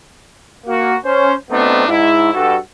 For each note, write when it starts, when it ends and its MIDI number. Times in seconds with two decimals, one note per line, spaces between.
0.66 0.95 58
0.66 0.95 66
1.05 1.33 61
1.05 1.33 72
1.51 1.88 47
1.51 1.88 57
1.51 1.88 59
1.51 1.88 60
1.51 1.88 62
1.51 1.88 63
1.88 2.31 44
1.88 2.31 64
2.34 2.57 43
2.34 2.57 66
2.34 2.57 69